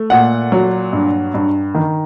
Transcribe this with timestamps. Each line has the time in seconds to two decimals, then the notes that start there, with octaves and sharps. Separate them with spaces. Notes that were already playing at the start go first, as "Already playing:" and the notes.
Already playing: A3
0.10 A#2 F#5
0.52 F#3
0.93 G2
1.34 G2
1.75 D#3